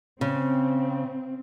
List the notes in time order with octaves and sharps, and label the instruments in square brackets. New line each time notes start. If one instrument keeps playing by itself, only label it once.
[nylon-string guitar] C#3 [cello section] C4